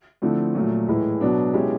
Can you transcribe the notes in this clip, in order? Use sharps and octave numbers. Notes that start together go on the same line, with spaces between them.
D3 F3 A3 C4 E4
A#2 F#3 A3
A2 E3 G#3
B2 F#3 B3 D4
B2 G#3 C#4 E4 G4